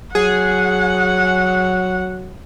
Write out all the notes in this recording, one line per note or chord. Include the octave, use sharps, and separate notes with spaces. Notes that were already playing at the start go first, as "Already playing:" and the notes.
F#3 G#4 F#5